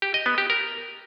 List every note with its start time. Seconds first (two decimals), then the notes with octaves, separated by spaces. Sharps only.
0.02 G4
0.14 D#5
0.26 B3
0.38 G4
0.50 A#4